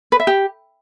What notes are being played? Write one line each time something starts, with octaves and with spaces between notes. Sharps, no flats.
B4
E5
G4